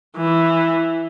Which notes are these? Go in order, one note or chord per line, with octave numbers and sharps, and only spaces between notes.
E3